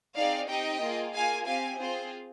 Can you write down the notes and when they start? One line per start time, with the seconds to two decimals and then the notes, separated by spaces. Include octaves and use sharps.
0.16 C4 D#4 G#4 D5 F5
0.48 C4 D#4 G4 D#5 G5
0.81 A#3 F4 G#4
1.13 A#3 F4 G#4 F5 G#5
1.46 C4 G4 F5 G#5
1.79 C4 F4 G#4 C5